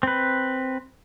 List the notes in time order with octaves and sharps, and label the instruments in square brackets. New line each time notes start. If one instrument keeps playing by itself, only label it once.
[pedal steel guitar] C4 B4